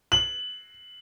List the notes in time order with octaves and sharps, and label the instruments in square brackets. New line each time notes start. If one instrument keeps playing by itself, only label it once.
[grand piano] F#7